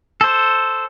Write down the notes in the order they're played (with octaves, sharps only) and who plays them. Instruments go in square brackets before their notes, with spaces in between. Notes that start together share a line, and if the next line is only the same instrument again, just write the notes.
[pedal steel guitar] A4 C5